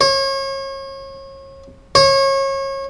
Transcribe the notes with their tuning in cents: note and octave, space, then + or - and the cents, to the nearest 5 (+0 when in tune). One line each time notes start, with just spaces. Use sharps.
C#5 -35
C#5 -30